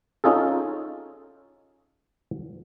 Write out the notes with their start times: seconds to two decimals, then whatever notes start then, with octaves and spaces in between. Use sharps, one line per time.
0.24 C#4 D#4 F4 G#4 A4